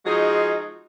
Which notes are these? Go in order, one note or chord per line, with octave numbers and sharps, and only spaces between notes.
F3 G#3 D#4 F#4 G#4